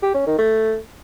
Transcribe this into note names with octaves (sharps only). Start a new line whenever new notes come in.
G4
C#4
D#3
A3